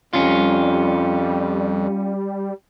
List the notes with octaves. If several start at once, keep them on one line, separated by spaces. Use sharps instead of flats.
F2 G3 C#4 F4